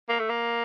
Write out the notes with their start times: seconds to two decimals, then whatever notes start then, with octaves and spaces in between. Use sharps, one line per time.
0.09 A#3
0.19 A3
0.29 A#3